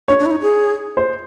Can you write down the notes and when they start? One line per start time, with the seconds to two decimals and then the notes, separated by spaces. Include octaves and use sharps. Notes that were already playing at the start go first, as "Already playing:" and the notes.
0.08 D4 C#5
0.19 D4
0.26 E4
0.31 D#4
0.42 G#4
0.97 C5